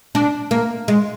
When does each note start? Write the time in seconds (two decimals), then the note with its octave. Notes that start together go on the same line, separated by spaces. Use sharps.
0.15 D4
0.51 A#3
0.88 G#3